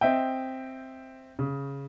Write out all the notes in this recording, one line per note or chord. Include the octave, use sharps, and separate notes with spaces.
C4 D#5 E5 G5
C#3